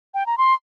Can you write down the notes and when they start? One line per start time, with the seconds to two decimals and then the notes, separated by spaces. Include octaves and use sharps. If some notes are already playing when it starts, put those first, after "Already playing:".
0.14 G5
0.26 A#5
0.38 C6